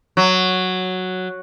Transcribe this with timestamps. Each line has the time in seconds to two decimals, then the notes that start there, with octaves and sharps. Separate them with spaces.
0.17 F#3